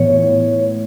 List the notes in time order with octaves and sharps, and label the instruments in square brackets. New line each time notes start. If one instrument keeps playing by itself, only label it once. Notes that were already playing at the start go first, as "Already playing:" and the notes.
Already playing: [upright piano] A2 E3 B3 [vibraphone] C#5